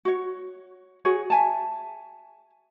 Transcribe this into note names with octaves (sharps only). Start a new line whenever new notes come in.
F#4 C#5
F#4 G#4 C#5
E5 G#5 A5